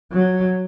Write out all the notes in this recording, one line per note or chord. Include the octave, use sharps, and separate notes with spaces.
F#3